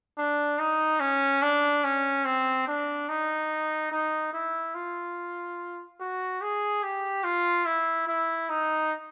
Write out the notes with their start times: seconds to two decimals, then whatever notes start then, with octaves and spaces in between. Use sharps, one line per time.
0.18 D4
0.59 D#4
1.00 C#4
1.42 D4
1.84 C#4
2.25 C4
2.67 D4
3.09 D#4
3.91 D#4
4.33 E4
4.75 F4
6.00 F#4
6.42 G#4
6.83 G4
7.24 F4
7.66 E4
8.08 E4
8.49 D#4